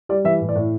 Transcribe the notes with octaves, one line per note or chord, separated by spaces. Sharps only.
G3 D5
E3 E5
A2
D5
A2